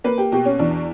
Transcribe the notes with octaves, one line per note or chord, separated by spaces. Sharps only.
A#3 B4
G4
B2 G4
C#4
E2 D4